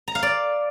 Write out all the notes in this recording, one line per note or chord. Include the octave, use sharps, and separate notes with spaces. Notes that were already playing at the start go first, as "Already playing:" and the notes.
A#5
F5
D5